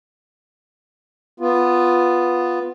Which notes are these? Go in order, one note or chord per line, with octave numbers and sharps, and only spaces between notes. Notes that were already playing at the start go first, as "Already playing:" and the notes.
B3 F4